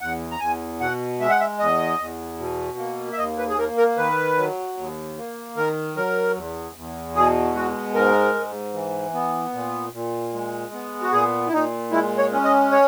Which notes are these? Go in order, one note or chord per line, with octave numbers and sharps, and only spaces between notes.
E2 F#5
A#5
E2 G#5
B2 F#5
G#3 E5
F#5
E5
E2 D#5
E2
B2
A#3
E5
D#2 D#5
B4
G#4
A#3 A#4
A#4
D#3 B4
F#3
D#2
A#3
D#3 A#4
F#3 A#4
E2
E2
B2 G#4
G#3 F#4
G#2 A#4
G#2
E3
B3
A#2
A#2
G#3
B3
F#4
A#2 G#4
E4
A#2 D#4
G#3 E4
C#5
C#4
D#5
C#5